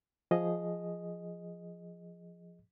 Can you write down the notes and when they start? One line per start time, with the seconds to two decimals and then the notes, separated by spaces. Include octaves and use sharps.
0.31 F3 G#4 D#5